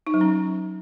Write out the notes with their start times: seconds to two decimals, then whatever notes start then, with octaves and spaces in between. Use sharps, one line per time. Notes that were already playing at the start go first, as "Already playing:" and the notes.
0.07 D#4
0.14 F#3
0.21 C#4